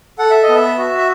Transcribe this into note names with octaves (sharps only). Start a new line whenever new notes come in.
A4 F#5
E5
D#5
B3
E5
F#4
E5